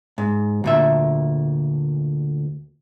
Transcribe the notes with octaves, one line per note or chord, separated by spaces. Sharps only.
G#2
D2 A#2 E5